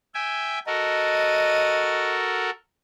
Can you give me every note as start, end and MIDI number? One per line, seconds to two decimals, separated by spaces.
0.15 0.59 76
0.15 0.59 79
0.15 0.59 80
0.67 2.50 66
0.67 2.50 69
0.67 2.50 70
0.67 2.15 75